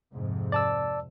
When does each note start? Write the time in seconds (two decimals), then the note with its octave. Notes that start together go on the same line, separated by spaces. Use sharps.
0.13 F2 G#2 C3
0.52 D5 A5 E6